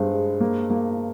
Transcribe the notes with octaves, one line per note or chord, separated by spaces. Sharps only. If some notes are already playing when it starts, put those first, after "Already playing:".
Already playing: G2 G#3 C5
G#3
A#3
A#3